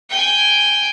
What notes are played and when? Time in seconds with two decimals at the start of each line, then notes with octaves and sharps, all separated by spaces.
0.10 G5 G#5